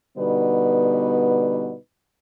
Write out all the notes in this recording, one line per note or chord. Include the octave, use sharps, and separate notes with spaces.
B2 D3 G3 B3 D#4 B4